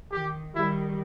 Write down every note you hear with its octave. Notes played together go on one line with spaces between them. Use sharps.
D#3 G4
D#3 G3 E4